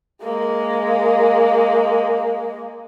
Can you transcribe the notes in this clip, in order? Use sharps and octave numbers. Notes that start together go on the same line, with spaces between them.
G#3 A#3